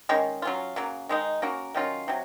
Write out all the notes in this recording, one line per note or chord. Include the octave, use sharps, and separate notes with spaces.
D#3 G#3 C#4
F#3 C#4 F4
C#3 F#3 A#3
D#3 G#3 D#4
A#3 C#4 F#4 A#4
D#3 F#3 C#4 F4
C3 F#3